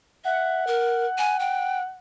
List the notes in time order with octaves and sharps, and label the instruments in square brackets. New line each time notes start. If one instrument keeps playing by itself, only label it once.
[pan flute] E5 [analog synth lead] F#5
[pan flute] A#4
G#5
G5